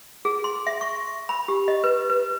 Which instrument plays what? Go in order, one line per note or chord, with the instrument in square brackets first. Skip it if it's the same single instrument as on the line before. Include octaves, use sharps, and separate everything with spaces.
[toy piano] G#4
C6
E5
C#6
B5
G4
D#5
B4
B4